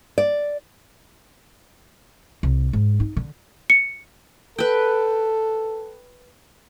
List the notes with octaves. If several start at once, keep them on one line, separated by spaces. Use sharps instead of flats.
D5
C2
G#2
D#4
D3
C#7
A4 B4 G5